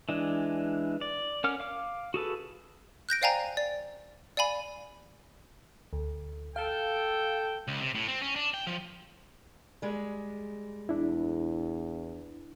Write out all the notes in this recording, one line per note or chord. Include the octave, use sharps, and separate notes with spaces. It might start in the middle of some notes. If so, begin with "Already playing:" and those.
E3 G#3 D4
D5
C#4 A#4 F#5 D6 F6
F5 D6
F#4 G#4 A4 B4
F#6 G6 A#6 D7
C5 D5 F5 G5 G#5 A#5
D5
D5 F5 G#5 B5
D2
A4 F5 G5
C#2
C3
A2
C4
C#4
D4
G5
F3
G3 G#3
E2 D4 E4